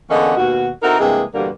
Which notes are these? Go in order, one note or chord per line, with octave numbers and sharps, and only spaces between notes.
E2 D3 A#3 C#4 D#5 F#5
D#2 B2 F#4
C4 D#4 E4 F#4 A4 A#4
G2 C3 E3 G#3 A#3 G#4
E2 G2 B2 D3 G3 A#3